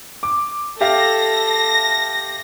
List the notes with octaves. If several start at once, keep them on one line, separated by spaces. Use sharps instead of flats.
D6
G4 A4 E5 F5 A#6